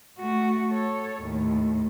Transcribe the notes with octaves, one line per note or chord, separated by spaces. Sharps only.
A3 F#4
A4 C#5
D#2 A2